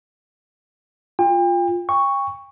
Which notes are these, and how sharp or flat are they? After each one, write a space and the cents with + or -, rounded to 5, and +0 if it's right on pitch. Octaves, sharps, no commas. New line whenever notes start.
F4 +5 G5 +40
G5 +40 C#6 +0